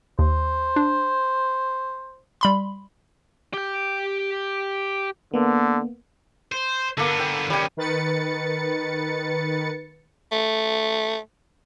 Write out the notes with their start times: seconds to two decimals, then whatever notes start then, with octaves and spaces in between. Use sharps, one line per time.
0.19 D#2 C5
0.76 D4
2.41 G3 B5 C6
3.54 G4 G5
5.34 D3 A#3 B3
6.52 C5
6.97 D3 A#3 B3 A4
7.19 G5
7.50 D#3 G3 C#4 G5
7.77 D#3 B4 A6 C#7
10.32 A3